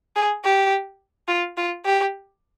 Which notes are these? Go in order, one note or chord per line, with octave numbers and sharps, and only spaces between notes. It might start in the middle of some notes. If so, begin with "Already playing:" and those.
G#4
G4
F4
F4
G4